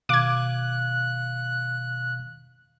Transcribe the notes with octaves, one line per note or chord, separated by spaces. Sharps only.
B2 D#3 F5 D6 F#6 G#6